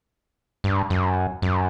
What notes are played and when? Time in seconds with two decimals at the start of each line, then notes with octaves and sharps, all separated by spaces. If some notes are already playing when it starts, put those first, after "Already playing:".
0.64 G2
0.90 F#2
1.42 F#2